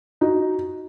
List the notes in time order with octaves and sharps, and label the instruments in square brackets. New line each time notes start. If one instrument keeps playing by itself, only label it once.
[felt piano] D#4 F#4